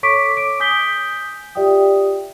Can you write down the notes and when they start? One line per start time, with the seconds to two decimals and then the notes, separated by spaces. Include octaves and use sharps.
0.03 A4 C#5 C#6 D6 B6 D7
0.34 D6 D7
0.60 G#5 D#6 G6 B6 G7
1.55 F4 G4 D5 E5 G5 D#6